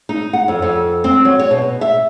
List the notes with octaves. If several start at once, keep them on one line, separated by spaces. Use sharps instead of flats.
D#4
F#5
F2
F2
C4
F#3
C#5
B2
E5